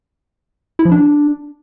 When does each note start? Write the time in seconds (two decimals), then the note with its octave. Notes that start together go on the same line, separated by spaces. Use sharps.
0.79 E4
0.85 F3
0.92 D4